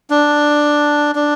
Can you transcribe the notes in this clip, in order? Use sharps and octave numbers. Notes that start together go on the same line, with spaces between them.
D4
D4